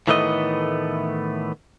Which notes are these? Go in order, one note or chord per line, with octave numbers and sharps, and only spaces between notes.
A2 D#3 E3 A3 B3 D#5